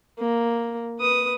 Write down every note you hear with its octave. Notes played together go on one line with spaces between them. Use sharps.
A#3
B4 D#6